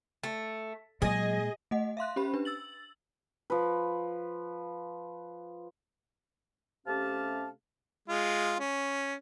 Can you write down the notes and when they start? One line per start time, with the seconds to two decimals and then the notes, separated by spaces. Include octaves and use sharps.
0.23 A3
1.02 A#2 F#3 G#3 G#4 D#5
1.71 A3 D#5 F#5
1.97 E5 F5 C6 F#6
2.16 C#4 G4 C5 B5
2.34 D4 B4
2.45 E6 A6 F#7
3.50 F3 B4
6.87 C3 A3 C#4 G4 F5 A5
8.09 G#3 F4
8.59 C#4